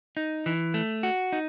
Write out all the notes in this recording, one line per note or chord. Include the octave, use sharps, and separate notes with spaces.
D#4
E3
A3
F#4
D#4